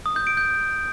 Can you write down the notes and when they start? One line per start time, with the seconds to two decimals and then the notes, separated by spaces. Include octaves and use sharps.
0.06 D#6
0.16 G6
0.27 D7
0.37 G6